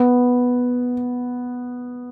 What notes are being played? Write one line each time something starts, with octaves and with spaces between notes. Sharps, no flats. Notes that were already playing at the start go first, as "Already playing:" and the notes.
Already playing: B3